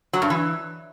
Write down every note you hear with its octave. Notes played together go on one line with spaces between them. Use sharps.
F#3
G2
E3